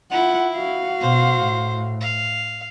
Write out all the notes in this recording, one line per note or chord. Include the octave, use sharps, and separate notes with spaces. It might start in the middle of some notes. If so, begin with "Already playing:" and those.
E4 F4 F#5
F#4 F5
B2 C5
A2
F5